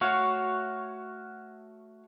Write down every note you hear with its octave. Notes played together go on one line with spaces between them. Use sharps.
A3 F#4 C#5 F5